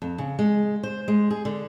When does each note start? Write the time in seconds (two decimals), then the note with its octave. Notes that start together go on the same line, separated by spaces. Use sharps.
0.02 F2
0.18 C#3
0.39 G#3
0.83 C5
1.08 G#3
1.30 G#4
1.45 D3